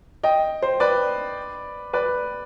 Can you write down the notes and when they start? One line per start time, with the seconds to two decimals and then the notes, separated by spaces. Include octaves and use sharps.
0.23 D#5 G5
0.62 C5
0.80 B4 D5
1.93 B4 D5